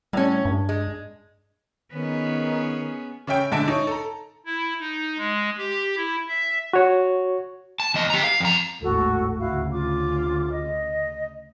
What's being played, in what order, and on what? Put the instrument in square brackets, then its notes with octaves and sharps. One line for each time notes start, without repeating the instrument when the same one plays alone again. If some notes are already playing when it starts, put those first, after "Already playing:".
[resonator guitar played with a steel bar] A2 C#4 [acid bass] G3
[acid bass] G2
[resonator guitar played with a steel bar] G#3
[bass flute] D#3 [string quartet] B3 C#4 G#4
[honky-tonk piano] C#3 C#4 E5 G5 D7
A#1 G#2 D3 E5 A5 D7
D#4 C#5
A4 A#5
[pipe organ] E4
D#4
G#3
G4
E4
E5
[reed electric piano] F#4 C#5
[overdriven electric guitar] A5
E2 D#5
G4 A#5
F5
F2 A#5
[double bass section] G#1 D#2 A2 [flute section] F#4 A4
[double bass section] D2 C#3 [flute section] E4 F#4 F5
[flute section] F4 D6
D#5